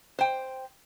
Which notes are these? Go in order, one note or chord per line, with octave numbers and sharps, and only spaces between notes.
C5 G5